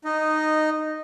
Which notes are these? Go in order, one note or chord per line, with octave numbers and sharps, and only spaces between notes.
D#4 D#5